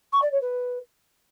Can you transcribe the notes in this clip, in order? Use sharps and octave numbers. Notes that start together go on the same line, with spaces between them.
C#6
D5
C#5
B4